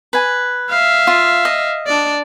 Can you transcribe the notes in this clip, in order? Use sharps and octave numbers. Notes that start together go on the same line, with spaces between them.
B4 G#5
E5 F5
F4
D#5
D4 D5